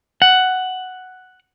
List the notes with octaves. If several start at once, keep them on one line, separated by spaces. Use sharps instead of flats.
F#5